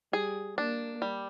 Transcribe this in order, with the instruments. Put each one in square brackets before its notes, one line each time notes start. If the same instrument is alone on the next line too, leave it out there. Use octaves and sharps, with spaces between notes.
[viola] G3 [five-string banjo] G#4
[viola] A#3 [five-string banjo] D4
[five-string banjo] G3